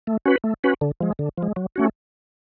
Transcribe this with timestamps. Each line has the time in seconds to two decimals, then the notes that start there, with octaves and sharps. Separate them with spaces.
0.07 A3
0.26 C#4 F#4 B4
0.44 A3
0.64 C#4 F#4 B4
0.81 D3
1.01 F3 G#3
1.19 D3
1.38 F3 G#3
1.56 F#3
1.76 A3 C#4 F#4